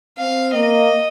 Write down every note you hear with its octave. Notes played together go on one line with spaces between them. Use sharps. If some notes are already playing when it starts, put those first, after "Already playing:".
C4 F5
A#3 D#5